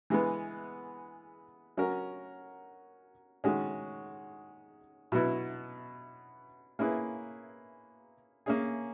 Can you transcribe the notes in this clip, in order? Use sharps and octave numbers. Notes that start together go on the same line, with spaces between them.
E3 G#3 B3
F#3 C#4 F#4 A#4
D#3 G#3 C#4 F#4
B2 F#3 B3 E4
A#3 C#4 E4 G#4 B4
A#3 C#4 G#4